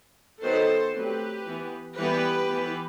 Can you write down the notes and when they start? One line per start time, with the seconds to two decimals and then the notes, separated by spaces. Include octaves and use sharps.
0.42 D#3 F#3 B3 A4 C5
0.94 F#3 A3 C4 G4 B4
1.46 E3 B3
1.98 E3 G3 B3 G4 B4
2.49 E3 B3